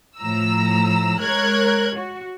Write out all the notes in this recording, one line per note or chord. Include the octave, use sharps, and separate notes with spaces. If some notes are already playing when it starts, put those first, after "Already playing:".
A2 F3 A#5 E6
G#3 A#4 C#5 F#6 G#6
F#4